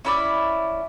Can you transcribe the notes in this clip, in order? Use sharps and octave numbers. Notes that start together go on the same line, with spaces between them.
C#4 E4 B4 D5